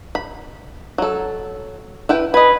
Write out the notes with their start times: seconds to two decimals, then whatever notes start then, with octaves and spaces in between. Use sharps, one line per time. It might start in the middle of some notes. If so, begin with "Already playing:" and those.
0.15 B5
0.98 F#3 A4
2.09 E4 B4 G5
2.34 B4 D#5 G#5